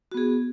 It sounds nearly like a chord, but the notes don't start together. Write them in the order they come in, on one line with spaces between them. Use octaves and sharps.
F#4 B3 G#4